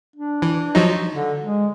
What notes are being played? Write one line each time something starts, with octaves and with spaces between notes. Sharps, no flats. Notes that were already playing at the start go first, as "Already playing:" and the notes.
D4
E3
F3 F#3 D#4
D3
G#3